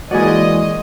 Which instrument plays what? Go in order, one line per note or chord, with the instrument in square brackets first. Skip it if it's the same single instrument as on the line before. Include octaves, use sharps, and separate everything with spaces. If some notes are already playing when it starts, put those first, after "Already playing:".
[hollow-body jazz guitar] E3 A#3 F#4 [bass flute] G#3 [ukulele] G#4 D5 [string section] D#5